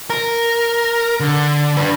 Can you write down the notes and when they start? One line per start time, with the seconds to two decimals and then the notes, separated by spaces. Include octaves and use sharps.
0.10 A#4
1.20 D3
1.77 D4 B4